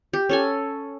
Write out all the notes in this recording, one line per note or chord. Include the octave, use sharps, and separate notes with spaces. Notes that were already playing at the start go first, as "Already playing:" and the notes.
G4
C#4 A4 G#5